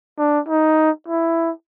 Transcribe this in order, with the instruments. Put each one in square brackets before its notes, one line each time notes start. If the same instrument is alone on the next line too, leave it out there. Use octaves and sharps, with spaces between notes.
[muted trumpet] D4
D#4
E4